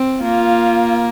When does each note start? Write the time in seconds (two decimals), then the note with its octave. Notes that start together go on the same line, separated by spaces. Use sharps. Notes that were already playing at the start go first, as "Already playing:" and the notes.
Already playing: C4
0.23 A#3 F4